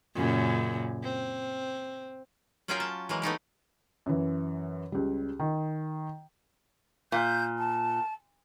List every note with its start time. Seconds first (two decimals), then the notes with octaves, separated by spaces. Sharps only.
0.15 F#2 A#2 C#3
1.04 C4
2.68 F#3 A#3 C#4 F4 G#4 G5
2.80 A5
3.09 E3 F#3 G#3 A#3
3.22 A3 B3 D#4 G4
4.06 F#2 E3
4.92 C#2 G3
5.39 D#3
7.12 A#2 G6
7.58 A5